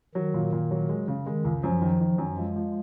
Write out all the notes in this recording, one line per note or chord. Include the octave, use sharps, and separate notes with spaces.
D#3 F#3
A#2
A#2
F#3
G#3
C#3
D#3 G#3
C#2
F#2 F3
D#3
D#3
F#2
F3 G#3
F3